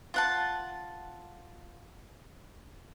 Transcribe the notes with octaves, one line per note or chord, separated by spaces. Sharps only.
F4 F#5 A5